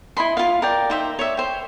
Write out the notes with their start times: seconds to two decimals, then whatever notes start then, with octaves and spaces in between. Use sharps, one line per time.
0.17 E4 D#5 B5 C6
0.37 F4 F5
0.62 A#4 D5 G5
0.90 D#4 C5 E5
1.19 C#5 D5 E5
1.37 C5 G5